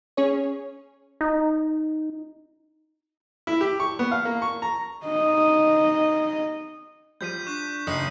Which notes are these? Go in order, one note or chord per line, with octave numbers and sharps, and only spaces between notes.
C#4 G#4 C#5
D#4
E4
G4
C#6
B3
F5
A#3
C#6
A#5
D#4 D#5
F3 G3 G6 B6 D#7
D4 C#6 F#6 B6
F#1 D#4 D#6 C7